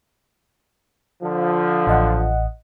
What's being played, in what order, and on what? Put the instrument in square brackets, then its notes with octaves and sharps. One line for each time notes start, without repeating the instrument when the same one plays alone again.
[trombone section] D3 F3
[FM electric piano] A1 D#5 F#5